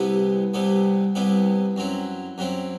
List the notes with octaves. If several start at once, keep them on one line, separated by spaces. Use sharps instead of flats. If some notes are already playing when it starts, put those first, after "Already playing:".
Already playing: C2 C3 G3 B3 E4
C2 C3 G3 B3 E4
C2 C3 G3 B3 E4
F#2 F#3 C4 E4
F#2 F#3 C4 E4